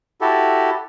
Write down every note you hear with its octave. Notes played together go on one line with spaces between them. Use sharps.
E4 F#4 G4 A4